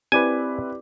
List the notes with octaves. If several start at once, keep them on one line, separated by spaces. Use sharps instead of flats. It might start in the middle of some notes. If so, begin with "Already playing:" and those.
C4 E4 G4 B4 D5 G#5 D6